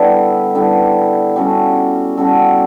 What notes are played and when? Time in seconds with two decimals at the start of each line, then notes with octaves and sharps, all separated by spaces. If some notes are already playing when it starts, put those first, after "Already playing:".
Already playing: D3 G3 B3 E4
0.55 D3 G3 B3 E4
1.36 G3 C#4 F#4 A4
2.17 G3 C#4 F#4 A4